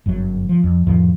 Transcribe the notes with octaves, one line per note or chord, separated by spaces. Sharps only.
G1 F#2 C#3 F#3
F3
F2
F2 A2 D#3 F3